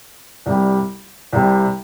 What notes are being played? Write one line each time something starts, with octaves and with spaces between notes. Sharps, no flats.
C2 C3 G3
C2 C3 G3